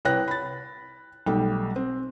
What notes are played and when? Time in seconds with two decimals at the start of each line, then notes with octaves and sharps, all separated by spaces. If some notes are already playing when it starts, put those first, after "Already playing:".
0.05 C2 B4 C#5 G5 F#6 A#6
0.28 B5 A6
1.26 B1 G3 A3 G5
1.76 C4